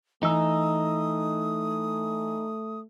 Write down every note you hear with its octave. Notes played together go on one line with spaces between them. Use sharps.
E3 A3 D#4 D#6 E6